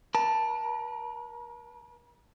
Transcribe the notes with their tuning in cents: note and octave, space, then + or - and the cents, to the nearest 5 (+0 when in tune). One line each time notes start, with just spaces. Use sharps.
A#4 +40 A5 +0